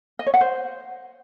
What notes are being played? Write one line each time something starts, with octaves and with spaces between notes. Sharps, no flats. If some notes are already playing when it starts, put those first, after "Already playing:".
D#5
C#5
F#5
C5